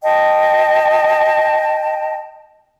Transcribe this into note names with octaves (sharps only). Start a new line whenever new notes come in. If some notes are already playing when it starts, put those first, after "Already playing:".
D#5 G5 A5